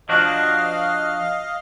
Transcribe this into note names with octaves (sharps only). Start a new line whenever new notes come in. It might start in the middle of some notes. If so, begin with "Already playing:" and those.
F3 D4 F#4 D#5 F5